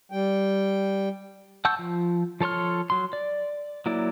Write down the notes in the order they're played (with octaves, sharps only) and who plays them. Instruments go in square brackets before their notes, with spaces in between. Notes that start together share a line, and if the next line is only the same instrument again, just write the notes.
[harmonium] G3 G5
[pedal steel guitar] F#5 A5 C#6 E6 G6
F3
F3 A4 C#5 C6 F6
F#3 C6
D5
F#3 A#3 E4 D5